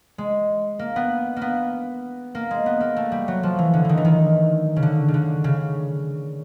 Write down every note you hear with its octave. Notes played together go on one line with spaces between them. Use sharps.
G#3
A#3
B3
A#3
B3
A#3
G#3
B3
A#3
A3
G3
F#3
F3
E3
D3
D#3 E3
E3
D#3
C#3
D3
C#3
D3
C#3